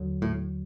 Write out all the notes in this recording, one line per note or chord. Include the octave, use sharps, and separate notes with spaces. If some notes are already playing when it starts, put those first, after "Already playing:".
Already playing: D#2 D3 F#3
A2